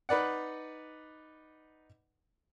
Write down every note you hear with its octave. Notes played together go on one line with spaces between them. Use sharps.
D#4 B4 D5 F#5